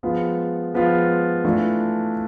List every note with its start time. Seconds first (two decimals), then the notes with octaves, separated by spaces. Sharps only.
0.03 F3 G#3 B3 F4
0.74 F3 G#3 B3 F4
1.45 E3 A3 D4 F4